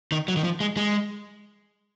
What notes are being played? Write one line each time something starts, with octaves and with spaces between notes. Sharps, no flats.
D#3
F#3
D#3
F3
G#3
G#3